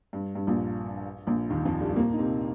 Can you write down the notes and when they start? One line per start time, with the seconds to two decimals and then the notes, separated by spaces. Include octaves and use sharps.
0.13 G2
0.35 G2
0.47 A#1 A#2
1.27 A#1 A#2
1.50 D#2 D#3
1.65 F2 F3
1.80 G2 G3
1.91 G3
1.96 A#2 A#3
2.13 D#4
2.19 C3 C4